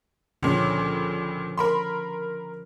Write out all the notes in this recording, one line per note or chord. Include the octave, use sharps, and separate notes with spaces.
C#2 A#2 D3 F3 C#4
A#4 B5 C6